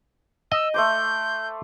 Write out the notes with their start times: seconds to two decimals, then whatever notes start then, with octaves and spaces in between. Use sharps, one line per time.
0.52 D#5 E6
0.74 A3 C5 D6 G6